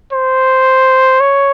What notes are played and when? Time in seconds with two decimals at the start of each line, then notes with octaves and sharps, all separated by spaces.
0.12 C5
1.21 C#5